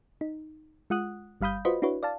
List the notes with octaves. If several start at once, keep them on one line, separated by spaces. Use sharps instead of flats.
D#4
G#3 F4 F#5 D#6 F#6
G1 G3 F5 B5 D#6 G6
F4 F#4 B4 C5 D#5 B5
D4 E4 F#4 B4 C#5
D5 F5 A5